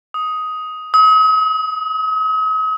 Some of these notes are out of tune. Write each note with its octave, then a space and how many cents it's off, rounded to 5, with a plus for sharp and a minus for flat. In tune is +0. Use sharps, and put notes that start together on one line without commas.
D#6 +10
D#6 +40